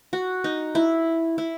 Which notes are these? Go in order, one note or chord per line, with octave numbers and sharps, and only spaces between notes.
F#4
D#4
E4
E4